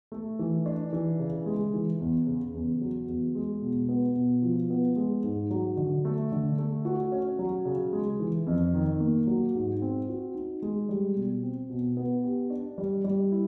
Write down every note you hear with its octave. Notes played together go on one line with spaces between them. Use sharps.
A3
E3
D4
E3
C#3
G#3
E3
E2
C#3
E2
F#3
E2
G#3
B2
B3
B2
F3
B3
G#3
G#2
F#3
D3
A3
D3
A3
F#4
C#4
F#3
C#3
G#3
E3
F2
D#3
A#3
F#3
G#2
C4
F#4
D#4
G#3
G3
B2
C4
B2
B3
G4
D4
G3
G3
E4